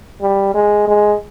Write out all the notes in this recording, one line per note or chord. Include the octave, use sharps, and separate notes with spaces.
G3
G#3
G#3